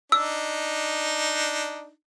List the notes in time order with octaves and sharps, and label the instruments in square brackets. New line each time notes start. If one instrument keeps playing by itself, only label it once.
[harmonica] D4 D#4 [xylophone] E6